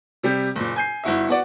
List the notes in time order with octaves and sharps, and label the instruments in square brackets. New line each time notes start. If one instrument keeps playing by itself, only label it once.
[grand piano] C3 G3 G4
F#1 A#2
G#5 G6 C7
G1 E4 F#4 E5
B3 F#4 D5